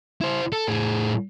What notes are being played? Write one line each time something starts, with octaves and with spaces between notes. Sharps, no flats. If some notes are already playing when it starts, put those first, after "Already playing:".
E4 C5
A4
A2 G#4